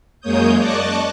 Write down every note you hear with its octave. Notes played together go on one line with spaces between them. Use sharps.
F#2 G#3 A#3 C#5 D#6 G6
D5 D#5 A5 C#6 D6 F#6